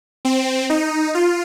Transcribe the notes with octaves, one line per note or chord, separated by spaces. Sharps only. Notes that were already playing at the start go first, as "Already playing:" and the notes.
C4
D#4
F4